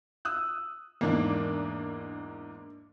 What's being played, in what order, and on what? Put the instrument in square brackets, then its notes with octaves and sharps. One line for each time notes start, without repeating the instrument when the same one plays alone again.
[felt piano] D#6 E6 F#6
[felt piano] E2 G#2 [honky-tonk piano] A#3 D4